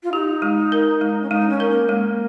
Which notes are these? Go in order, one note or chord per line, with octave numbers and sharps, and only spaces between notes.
F4
D#4 G4
G#3
A#4
G#3
C#4
G#3 D#4
C#4
A#4
A#3
G#3 A#3